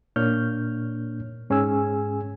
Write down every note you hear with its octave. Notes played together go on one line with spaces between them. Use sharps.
A#2 A#3 D4 C#5 F6 G6
G#2 C#4 G#4 G#5 E6